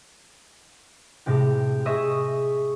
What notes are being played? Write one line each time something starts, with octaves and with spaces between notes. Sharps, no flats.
A2 C3 G#3 G4
G#4 D#5 E5 C#6 D#6